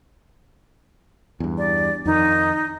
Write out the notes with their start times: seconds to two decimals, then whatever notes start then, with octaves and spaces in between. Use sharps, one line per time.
1.40 E2 G2
1.58 D5
2.05 F2 D#3 D#4